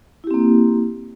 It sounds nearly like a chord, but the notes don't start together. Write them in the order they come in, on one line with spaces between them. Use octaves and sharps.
E4 G4 C4 A#3